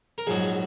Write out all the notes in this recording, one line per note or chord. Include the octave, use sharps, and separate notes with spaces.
A#4
A#1 G#2 F#3 G#4